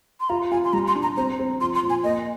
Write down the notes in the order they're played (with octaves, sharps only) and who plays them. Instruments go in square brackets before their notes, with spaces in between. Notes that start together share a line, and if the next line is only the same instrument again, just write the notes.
[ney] C6
[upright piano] F4 [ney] A#5
[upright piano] F4 [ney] G#5
[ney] C6
[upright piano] G3 [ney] A#5
[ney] C6
[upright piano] D4
[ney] A#5
[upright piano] C4 [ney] A#5
[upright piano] C4
[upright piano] F3 [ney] C6
[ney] C6
[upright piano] A#2
[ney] G#5
[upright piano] A#3 [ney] D#5